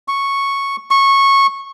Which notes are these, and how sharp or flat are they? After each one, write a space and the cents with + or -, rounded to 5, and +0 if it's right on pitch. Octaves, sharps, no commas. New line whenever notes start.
C#6 -5
C#6 -15